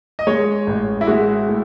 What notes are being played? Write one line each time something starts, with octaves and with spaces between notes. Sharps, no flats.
D#5
G#3 C#5
A1
E4
G#3 F#4
A2